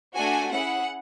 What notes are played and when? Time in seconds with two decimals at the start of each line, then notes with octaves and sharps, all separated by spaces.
0.15 A3 D4 F#4 G#5
0.52 C#4 E4 G#4 F#5